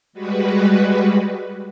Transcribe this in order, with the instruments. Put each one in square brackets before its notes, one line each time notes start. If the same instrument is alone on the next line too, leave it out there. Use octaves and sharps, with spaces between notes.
[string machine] G3 G#3 F#4 B4